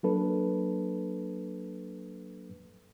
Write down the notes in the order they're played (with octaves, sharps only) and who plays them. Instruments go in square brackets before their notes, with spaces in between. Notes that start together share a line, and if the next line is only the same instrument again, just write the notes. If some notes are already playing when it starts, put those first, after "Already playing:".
[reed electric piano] F#3 A#3 D4 A4 B4